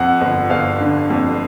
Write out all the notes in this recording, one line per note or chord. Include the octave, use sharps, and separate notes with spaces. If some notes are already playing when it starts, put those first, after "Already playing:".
Already playing: F2 F#5
G1
G1 F5
D3
F2